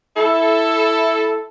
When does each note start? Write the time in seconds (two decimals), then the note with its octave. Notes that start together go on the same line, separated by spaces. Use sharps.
0.17 E4 A4